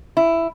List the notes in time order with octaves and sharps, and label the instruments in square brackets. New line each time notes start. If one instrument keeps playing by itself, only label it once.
[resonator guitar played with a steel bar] E4